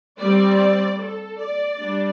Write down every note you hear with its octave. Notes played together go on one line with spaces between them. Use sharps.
G3 C4 D5
A4
D5
G3 D4